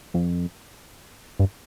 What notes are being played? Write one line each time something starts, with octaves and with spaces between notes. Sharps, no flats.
F2
G2